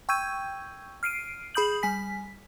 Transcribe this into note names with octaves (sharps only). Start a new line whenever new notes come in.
G5 C#6 E6 G6 G#6 D#7
F6 C7 D7 D#7
G#4 B5 D#6 G6 F#7
G3 G#5 B6